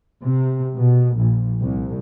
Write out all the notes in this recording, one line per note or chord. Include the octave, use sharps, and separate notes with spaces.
C3
B2
A#1
C2